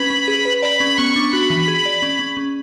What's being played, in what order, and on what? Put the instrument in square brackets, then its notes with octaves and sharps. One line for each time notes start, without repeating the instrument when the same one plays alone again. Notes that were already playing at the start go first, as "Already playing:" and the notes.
Already playing: [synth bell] C#4 B4 [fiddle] B5
[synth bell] C#4
G#4
B4
[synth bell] D5 [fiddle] B5
[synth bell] C#4
[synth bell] B3 [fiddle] C#6
[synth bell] D4
[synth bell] F#4 [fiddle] B5
[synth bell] E3
G#4
D5
C#4
C#4
C#4